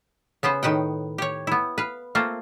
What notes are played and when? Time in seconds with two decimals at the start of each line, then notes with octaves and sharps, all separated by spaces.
0.43 C#3 B3 B4 C5
0.63 A2 D#3 B4 F#5 G5
1.18 G4 C#5
1.47 B3 E4
1.78 B4 F5
2.15 A3 A#3 C4 F4 A4